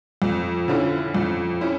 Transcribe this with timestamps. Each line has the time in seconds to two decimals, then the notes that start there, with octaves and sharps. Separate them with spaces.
0.22 F2
0.68 D3 F3 C#4 E4
1.14 F2
1.61 C#4 E4